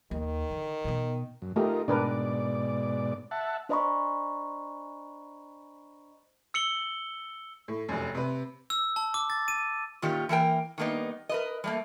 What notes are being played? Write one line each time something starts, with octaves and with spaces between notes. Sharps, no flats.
D#2 D#3
D3
B2 B3
F#2
A3 D#4 F4 G4 A#4
G#2 B2 D4 A#4 B4 D5
E5 F#5 A5
D4 C5 D#5 A#5 B5 C#6
E6 C#7 F#7 G7
A2
F1 F#2
C3 B4
E6
A5
D6
A6
D#7
A#2 D#3 C#4 F4 G4
E3 A#3 A#4 G5
D#3 G3 A#3 B3 D#4
A#4 B4 D#5
G3 A3 A#3